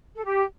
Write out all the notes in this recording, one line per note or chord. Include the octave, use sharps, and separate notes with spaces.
A4
G4